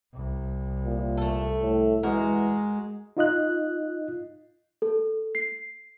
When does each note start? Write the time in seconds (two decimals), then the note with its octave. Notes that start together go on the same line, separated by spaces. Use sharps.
0.14 C2
0.85 A#2
1.17 A3 A4
1.62 A2
2.03 E3 G#3 F#4 A#4
3.17 D#4 F4 D#5 F#6
4.82 A4
5.35 C7